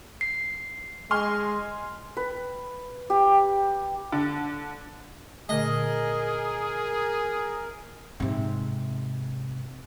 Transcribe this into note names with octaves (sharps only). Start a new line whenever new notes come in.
C7
G#3 G#5 C6 F6
B4
G4
D3
A#2 D3 A3 G#4 A#4 D#5
G#2 C3